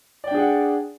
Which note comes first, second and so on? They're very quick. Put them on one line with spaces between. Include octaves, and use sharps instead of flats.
D5 G5 D4 G#4 F#5